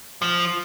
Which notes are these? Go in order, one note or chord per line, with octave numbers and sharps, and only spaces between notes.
F3